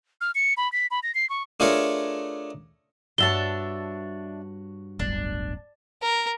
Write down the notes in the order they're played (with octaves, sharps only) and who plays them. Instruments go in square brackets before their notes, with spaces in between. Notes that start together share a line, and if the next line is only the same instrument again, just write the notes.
[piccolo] F6
C#7
B5
B6
B5
A#6
C7
C#6
[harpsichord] A3 D4 F4 G#4 A#4 C#5
[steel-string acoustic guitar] G2 F#4 C#5 [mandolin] D4 E5 A5 [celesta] G7
[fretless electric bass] D1 G1 [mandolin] D4
[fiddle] A#4